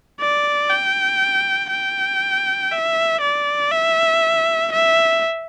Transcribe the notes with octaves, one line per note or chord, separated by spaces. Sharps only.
D5
G5
G5
E5
D5
E5
E5